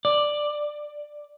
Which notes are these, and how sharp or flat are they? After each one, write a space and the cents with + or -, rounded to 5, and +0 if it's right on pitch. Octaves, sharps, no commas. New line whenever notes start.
D5 +10